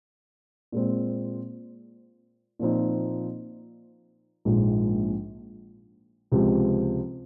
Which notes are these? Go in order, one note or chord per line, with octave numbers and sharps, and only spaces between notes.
A#2 G#3 C4
A#2 F3 C4 D#4
A#1 G#2 F3 G#3
C#2 C3 F3 G#3 C4